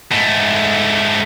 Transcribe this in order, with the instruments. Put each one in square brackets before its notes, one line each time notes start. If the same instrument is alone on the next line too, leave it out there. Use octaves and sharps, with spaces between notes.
[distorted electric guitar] G#2 A3